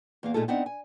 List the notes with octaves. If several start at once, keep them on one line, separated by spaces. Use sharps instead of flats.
E2 A#3 F5
A#2 A3 D#4 F4 G#4 A4
B3 C4 D4 D#4 E5 F#5
G#5